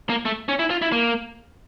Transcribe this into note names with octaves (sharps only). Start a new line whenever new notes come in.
A#3
A3
C#4
E4
F4
E4
A#3